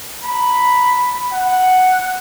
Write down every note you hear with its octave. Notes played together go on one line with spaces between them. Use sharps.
A#5 B5
F#5